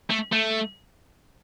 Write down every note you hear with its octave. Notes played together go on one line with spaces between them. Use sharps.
A3
A3